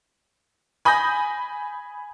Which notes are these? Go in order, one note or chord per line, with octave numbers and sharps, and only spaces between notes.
G#5 B5 D#6 G6 A#6